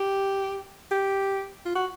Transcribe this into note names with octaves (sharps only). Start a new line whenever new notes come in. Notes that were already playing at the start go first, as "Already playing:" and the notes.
Already playing: G4
G4
F4
F#4